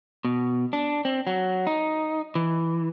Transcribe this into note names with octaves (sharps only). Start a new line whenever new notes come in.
B2
D4
C4
F#3
D#4
E3